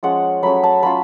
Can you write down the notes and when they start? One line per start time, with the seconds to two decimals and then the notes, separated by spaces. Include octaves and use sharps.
0.03 F3 G#3 C#4 F4 F#5
0.43 F#3 A3 C#4 B5
0.63 A5
0.83 F#3 C#4 F4 B5